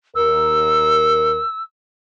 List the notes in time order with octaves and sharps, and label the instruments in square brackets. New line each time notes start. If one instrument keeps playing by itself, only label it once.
[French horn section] D#2 A#4 [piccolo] E6